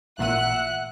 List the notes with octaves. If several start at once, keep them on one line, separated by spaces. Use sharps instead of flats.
A1 A#2 E5 F#5 F#6 D#7